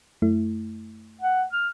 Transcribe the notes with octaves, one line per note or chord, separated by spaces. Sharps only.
F#2 A3 E4
F#5
F6